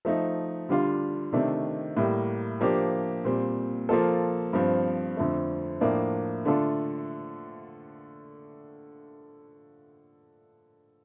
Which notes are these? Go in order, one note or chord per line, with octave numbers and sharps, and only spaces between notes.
F3 A3 D#4
D3 G3 D4 F4
C3 D#3 A3 D4
A2 G3 A#3
F3 A#3 D4 G4
A#2 G3 C4
F3 A#3 F4 A4
G2 F3 C4
F2 D3 A3
A2 F3 A#3 D4
D3 A3 D4 F4 A4